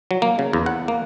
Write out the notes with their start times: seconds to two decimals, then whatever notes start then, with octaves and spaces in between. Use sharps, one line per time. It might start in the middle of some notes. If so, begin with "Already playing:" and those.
0.11 F#3
0.22 A#3
0.39 C#3
0.53 E2
0.66 F#5
0.88 A#3